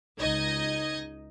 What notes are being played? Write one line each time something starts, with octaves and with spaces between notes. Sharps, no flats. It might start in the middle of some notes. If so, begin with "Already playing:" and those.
C#2 D#4 D#5 G#6